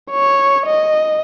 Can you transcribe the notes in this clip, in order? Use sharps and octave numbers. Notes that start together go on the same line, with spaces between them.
C#5
D#5